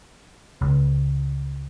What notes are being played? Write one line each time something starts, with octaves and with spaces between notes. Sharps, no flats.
C#2